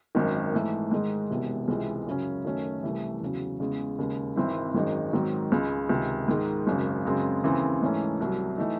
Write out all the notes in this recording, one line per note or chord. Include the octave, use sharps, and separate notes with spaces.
G#1 F#2 D#3
G#2 E3 A3
G#2 D#3 G#3 D#4
E1 E2 C3
C#2 C3 E3 G#3
F#2 C#3 F#3 C#4
F#2 D#3 A3 C#4
C2 C3 E3 A3
E2 C#3 F#3
E2 C#3 G#3
D#2 C#3 G#3
G#1 G#2 E3 C4 E4
G#1 F#2 D#3 G#3 D#4
G#2 D#3 F#3 C4
C#2 C#3 G#3
C#2 C3 D#3
G#2 D#3 G#3
G#1 F#2 C#3
F#2 C#3 G#3 C4
D#2 C#3 E3 C4
G#2 E3 A3 C#4
C2 C3 F#3
E3 A3 D#4